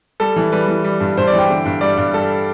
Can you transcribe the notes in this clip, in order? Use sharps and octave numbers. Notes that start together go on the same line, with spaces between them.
G3 A4
E3
G3 B4
E3
G3
G2
G2 C5
D5
E3
G5
D3
G2
G3 D5
G2
G3 A4